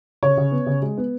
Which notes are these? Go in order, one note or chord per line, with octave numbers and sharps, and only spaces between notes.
C#3 C#5
C#3
B3
C#3
G#3
B3